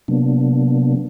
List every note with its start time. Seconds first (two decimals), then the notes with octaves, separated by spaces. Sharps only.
0.08 C3 F#3 A#3 B3 D4